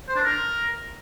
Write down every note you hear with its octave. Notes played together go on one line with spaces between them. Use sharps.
C5
D4
A#4